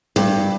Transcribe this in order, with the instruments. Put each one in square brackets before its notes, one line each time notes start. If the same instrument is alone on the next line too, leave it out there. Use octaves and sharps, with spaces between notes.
[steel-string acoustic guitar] G2